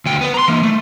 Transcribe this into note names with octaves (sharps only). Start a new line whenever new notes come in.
D2 G5
B3 B4
A#5 C6
E3 A#3
A3